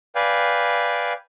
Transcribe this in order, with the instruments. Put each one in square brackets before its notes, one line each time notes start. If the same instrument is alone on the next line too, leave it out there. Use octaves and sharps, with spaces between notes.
[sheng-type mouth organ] B4 D5 F5 G5 G#5